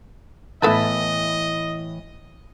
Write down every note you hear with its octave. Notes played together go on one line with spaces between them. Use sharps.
A2 E3 B3 E4 A4 B4 D#5 A5